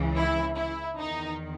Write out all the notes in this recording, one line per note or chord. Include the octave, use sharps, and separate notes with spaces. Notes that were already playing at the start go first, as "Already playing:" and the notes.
Already playing: C#2 C#3 E3
E4
E4
E2 D#3 D#4